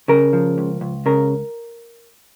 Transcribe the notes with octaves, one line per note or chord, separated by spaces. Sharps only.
C#3 A#4
F3
C#2
C#2
C#3 A#4